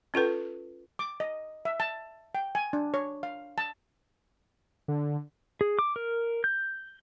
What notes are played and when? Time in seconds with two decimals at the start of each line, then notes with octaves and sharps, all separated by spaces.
0.14 C#4 F4 A4 B4
0.99 D6
1.20 D#5
1.65 E5
1.80 A5
2.35 G5
2.55 G#5
2.73 D4
2.94 C#5
3.23 F5
3.58 A5
4.88 D3
5.61 G#4
5.79 D6
5.96 A#4
6.44 G6